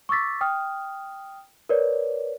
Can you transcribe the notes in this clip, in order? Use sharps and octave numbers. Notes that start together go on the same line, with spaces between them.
C#6 D6 E6 A6 B6
G5 D#6 F6
A#4 B4 C#5 D5